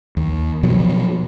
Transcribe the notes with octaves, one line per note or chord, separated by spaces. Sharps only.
D#2
B2 F3 F#3